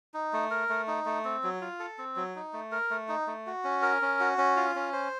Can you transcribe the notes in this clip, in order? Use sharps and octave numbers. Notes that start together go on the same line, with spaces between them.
D#4
A3
A#4
A3
D#4
A3
C4
F#3
F4
A4
C4
F#3
D#4
A3
A#4
A3
D#4
A3
F#4
C#4
A#4
C#4
F#4
C#4
F4
C#4
C5